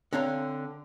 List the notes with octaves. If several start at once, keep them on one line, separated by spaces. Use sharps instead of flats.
D3 C4 D4 C#5 F5 A#5